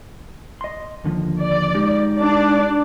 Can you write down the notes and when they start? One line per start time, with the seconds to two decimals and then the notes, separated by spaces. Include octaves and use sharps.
0.61 D#5 C6
1.04 D#2 D3 F3
1.39 D5
1.74 G#3 D#4 G4
2.20 D4 D5